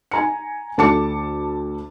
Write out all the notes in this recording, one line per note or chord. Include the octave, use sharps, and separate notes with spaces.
G#5 A#5 C#7
D2 A4 A5 D6 C#7